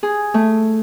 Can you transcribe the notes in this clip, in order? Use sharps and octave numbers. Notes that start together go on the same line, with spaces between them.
G#4
A3